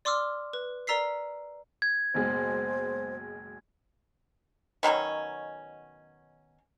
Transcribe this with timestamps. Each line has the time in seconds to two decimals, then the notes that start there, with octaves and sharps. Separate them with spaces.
0.05 D5 C6 D6 E6 F6
0.53 B4
0.87 A#4 D5 A#5 E6 B6 C7
1.82 G#6
2.14 F#1 B1 G#3 C5
4.83 B2 D#3 F#3 C#4